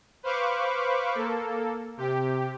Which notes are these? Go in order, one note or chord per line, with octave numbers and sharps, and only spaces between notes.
B4 C5 F5 B5 C#6 D6
A#3 A4
C3 G4